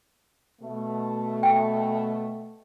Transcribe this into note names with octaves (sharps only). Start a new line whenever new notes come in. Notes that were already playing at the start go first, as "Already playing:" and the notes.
B2 A3
G5